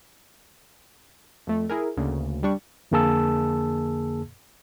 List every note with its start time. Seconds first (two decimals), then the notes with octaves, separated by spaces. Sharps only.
1.47 F2 A3
1.70 E4 G#4 A#4
1.97 D2 C#3 A#3
2.43 G3 D4 C#6
2.91 F2 D3 A#3 G#4 A5 E6